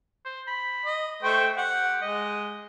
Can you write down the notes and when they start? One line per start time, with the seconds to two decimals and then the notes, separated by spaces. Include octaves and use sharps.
0.25 C5
0.47 B5
0.86 D#5
1.23 A3 C5 G5 C#6
1.57 G4 F#5
2.02 G#3 D#5